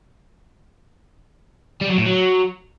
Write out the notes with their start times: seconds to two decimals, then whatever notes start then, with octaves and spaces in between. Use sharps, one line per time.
1.81 G3
1.89 F#3
1.98 A2
2.06 F#3